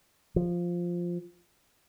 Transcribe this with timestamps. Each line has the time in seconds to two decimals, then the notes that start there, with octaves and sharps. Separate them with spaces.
0.36 F3